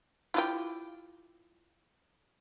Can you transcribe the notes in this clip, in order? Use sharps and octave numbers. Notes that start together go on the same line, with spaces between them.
E4 F4 G4